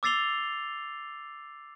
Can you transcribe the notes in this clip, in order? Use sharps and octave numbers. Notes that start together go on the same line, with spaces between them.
D6 E6 A6 C7 F7 G7